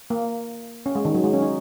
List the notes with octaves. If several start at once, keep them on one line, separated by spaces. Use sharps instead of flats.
A#3
C#4
G#3
D#3
F#3
G#3
C#4
D#4